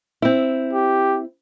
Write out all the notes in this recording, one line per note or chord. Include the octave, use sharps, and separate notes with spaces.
C4 E4
G4